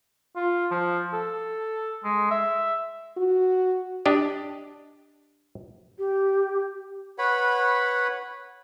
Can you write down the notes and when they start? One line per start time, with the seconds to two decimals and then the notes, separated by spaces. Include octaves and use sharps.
0.36 F4
0.71 F3
1.13 A4
2.04 G#3
2.31 E5
3.17 F#4
4.06 D4 G4 D#5
5.98 G4
7.18 B4 C#5 F#5 B5